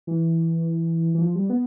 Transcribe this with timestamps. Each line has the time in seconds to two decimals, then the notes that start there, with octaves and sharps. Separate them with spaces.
0.07 E3
1.14 E3
1.21 F3
1.36 G3
1.50 B3